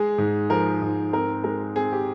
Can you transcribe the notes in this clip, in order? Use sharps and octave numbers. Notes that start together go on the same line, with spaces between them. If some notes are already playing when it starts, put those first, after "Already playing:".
Already playing: G#3 G#4
G#2
F3 A#4
G#2
C4 A#4
G#3 A#4
C4 G#4
G4